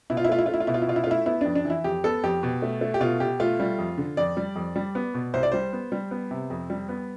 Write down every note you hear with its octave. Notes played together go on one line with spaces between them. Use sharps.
B2 E4
F4
E4
A3 F4
E4
A3 F4
E4
F4
B2 E4
F4
E4
B2 F4
E4
F4
A3 E4
B3 E4
F2 D4
D4
E3 E4
F2 G4
B3 A4
F2 G4
B2
A3
A3
G4
B2 F4
B2 G4
A3 F4
G3
F2
D3
F2 D5
G3
F2
G3
B3
B2
C2 C5
D5
G3 C5
B3
G3
B3
C3
F2
G3
B3